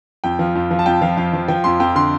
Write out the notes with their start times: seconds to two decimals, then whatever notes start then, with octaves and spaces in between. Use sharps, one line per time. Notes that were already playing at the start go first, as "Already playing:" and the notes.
0.24 F2 G5
0.39 F3
0.55 F2
0.71 F3
0.79 A5
0.86 F2 G5
1.02 F3 F5
1.17 F2 F5
1.33 F3
1.48 F3 G5
1.64 F2 C6
1.80 F2 G5
1.95 D3 C6